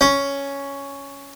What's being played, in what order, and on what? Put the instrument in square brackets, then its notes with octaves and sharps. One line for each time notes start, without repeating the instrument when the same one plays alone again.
[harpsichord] C#4